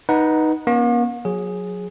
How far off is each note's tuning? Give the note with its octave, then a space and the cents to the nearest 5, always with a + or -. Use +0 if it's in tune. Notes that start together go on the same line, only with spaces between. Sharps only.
D#4 +0 B4 -20 F#5 +0
A#3 +45 C#4 +0 C#6 -35
F#3 -25 G#4 +0